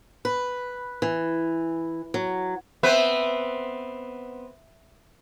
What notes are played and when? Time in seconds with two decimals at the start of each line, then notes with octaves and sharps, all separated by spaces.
0.25 B4
1.02 E3
2.14 F#3
2.83 B3 C4 B4 E5